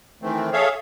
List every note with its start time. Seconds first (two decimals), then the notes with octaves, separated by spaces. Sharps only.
0.22 D#3 E3 A3 C4
0.53 G#4 A4 C#5 E5 F5